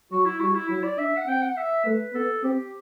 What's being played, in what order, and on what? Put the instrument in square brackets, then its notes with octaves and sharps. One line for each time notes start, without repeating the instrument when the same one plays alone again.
[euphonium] F#3 [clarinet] F#4
[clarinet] E4
[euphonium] G3 [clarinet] F#4
[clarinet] E4
[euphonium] F#3 [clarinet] E4
[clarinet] D5
[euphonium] D4 [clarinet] E5
[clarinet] F#5
[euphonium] C4 [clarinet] G5
[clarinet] F#5
E5
[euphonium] A3 [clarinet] B4
[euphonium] B3 [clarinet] A4
[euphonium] C4 [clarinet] G4